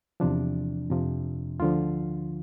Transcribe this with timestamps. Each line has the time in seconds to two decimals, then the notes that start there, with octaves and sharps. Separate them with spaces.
0.20 E2 C3 F3 D4
0.90 F2 C3 F3
1.60 D2 D3 F3 F4